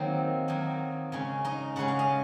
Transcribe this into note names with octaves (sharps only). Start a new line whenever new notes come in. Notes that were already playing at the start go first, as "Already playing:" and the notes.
Already playing: D#3 F#3 A#3 C4 D#4 C5
D#3 F#3 A#3 D#4
C#3 G#3 C#4
D#4 D#5
C#3 G#3 C#4 F#5
F5
D#5